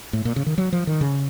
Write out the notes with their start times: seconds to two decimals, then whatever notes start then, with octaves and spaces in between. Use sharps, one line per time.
0.13 A2
0.25 A#2
0.36 C#3
0.46 D#3
0.58 F#3
0.73 F3
0.87 D#3
1.01 C#3